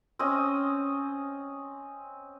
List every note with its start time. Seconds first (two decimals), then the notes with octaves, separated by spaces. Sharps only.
0.19 C4 C#4 D#5